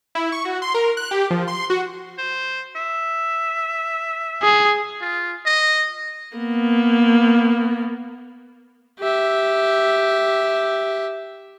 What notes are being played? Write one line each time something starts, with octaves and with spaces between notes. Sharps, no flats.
E4
C#6
F#4
C6
A#4
F#6
G4
F3
C6
F#4
C5
E5
G#4
F4
D#5
A#3 B3
G4 E5